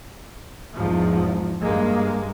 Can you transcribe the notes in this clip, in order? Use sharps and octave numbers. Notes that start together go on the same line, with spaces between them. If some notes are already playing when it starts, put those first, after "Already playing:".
E2 G#2 F3
G2 G#3 A#3